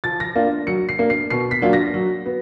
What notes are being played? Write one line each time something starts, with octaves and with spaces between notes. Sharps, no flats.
F3 A6
A#6
A#3 D4 F4
F#3 C#7
C7
A#3 D4
C7
B2 C7
B6
F#3 A#3 D4 F4
A#6
F#3
B3